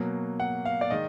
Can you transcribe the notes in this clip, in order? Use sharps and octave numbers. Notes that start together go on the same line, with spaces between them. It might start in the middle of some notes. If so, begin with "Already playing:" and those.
Already playing: B2 F#3 A#3
F#5
F5
D5
D#3 G#3 D#5